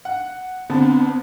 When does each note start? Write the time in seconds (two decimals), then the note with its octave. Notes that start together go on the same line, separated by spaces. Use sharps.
0.05 F#5
0.70 D3 B3 C4 A5